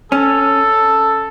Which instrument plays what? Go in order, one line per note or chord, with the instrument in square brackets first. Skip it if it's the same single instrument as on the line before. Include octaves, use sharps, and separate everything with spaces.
[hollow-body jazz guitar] C#4 [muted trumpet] A4